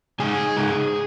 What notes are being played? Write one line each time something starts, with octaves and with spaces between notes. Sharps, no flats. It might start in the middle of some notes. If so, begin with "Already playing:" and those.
C#3 G#3 D#4 G#4 G#5
C#3 G#3 D#4